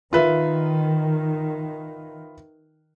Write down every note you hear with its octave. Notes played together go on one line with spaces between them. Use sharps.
D#3 F4 B4 E5